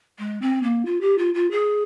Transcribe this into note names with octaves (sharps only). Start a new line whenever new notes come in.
G#3
C4
A#3
F4
G4
F4
F4
G#4